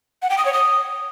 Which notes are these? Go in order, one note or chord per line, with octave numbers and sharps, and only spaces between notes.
F#5
G5
D#6
C#5
D#6